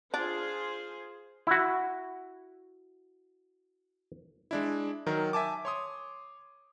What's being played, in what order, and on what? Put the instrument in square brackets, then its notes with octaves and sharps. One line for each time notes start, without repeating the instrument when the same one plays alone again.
[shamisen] D4 [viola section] F4 G#4 C5
[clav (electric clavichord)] E4 F#4
[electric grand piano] G#3 D4 E4
D#3 F#3 A#4
E5 G#5 A5 D6
C#5 C6 D#6